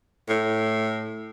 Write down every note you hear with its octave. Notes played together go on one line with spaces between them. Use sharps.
A2